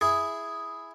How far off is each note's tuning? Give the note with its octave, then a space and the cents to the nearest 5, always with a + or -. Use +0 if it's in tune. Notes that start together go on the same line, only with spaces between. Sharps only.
E4 +0 G#4 +0